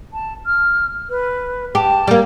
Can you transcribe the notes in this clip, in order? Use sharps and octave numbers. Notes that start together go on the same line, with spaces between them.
A5
F6
B4
G4 A5
G3 A#3